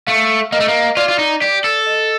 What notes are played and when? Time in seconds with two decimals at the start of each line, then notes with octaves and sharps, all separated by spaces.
0.07 A3 F5
0.52 A#3 D#5
0.60 A3
0.68 A#3
0.97 F4 D5
1.09 F4
1.19 D#4
1.41 G4 D5
1.64 A4
1.87 D#5